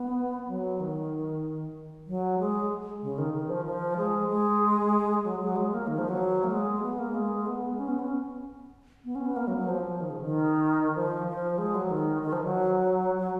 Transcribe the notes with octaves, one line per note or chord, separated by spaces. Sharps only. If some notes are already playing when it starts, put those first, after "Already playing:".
Already playing: B3
F#3
D#3
F#3
G#3
C#3
D#3
D#3
F3
F3
G#3
G#3
F#3
F#3
G#3
A#3
D#3
F3
F#3
A#3
G#3
B3
A#3
G#3
B3
C#4
B3
C#4
B3
C#4
B3
A#3
F#3
F#3
F3
D#3
C#3
D#3
F3
F3
G#3
F#3
D#3
D#3
F3
F#3
F#3